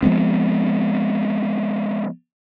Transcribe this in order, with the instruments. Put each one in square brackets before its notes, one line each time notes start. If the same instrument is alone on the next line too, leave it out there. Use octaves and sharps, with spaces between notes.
[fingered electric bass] F3 G#3 B3 C4